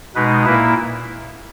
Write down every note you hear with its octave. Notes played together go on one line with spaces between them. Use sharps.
B2 G#3 D#4 B4
A#2 A#3 E4 B4